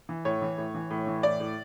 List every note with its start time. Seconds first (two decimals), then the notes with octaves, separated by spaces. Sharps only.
0.09 E3
0.25 A2 C#5
0.42 E3
0.58 A2
0.74 E3
0.90 A2
1.07 E3
1.23 A2 D5
1.40 A2